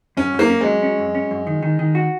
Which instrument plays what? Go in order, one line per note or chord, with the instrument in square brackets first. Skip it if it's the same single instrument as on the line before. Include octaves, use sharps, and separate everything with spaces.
[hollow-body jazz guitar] F#2 [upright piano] C#4
[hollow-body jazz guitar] F#2
[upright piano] A#3
[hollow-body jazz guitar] C#4
[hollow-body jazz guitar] F#3 [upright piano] G#3
[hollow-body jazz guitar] C#4
F#2
C#4
F#2
D#3
D#3
D#3
F#4